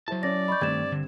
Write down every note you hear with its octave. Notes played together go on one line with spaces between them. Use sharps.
F#3 E4 C5 A5
C#4 E4 C#5 D5 A#6
D#5 B5 C#6 G6
G2 D#3 A3 C4 G#6 E7
D3